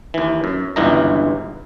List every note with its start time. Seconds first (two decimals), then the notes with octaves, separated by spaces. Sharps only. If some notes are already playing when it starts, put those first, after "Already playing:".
0.14 D#2 E3
0.44 F#2
0.76 G1 C#2 G2 E3 D#4 A#5